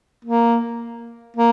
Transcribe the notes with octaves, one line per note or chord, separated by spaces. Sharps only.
A#3
A#3